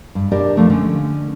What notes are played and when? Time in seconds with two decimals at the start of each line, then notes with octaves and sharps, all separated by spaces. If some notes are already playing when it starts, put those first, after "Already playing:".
0.15 G2
0.31 B2 D4 G4 A#4 D5
0.57 D3 F3 A3
0.70 D3 G#3 C#4